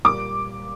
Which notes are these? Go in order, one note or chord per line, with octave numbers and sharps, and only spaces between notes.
A#2 G3 A#3 D6